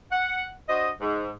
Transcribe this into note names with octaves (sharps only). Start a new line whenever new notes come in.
F#5
D4 F#4 C5 D#5
G#2